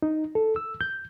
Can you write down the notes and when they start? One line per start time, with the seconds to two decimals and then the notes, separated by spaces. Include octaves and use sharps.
0.02 D#4
0.35 A4
0.56 E6
0.81 G6